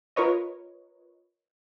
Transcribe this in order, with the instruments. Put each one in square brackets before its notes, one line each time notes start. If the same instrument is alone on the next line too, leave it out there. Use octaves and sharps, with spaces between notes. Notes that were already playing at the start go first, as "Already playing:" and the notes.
[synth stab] F4 A#4 B4 C#5 D#5